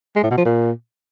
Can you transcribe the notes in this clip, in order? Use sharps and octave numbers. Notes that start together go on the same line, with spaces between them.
G#3
A2
B2
F3
A#2